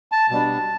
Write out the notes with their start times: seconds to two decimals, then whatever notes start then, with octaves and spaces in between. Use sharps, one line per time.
0.12 A5
0.31 B2 G3 D4 A5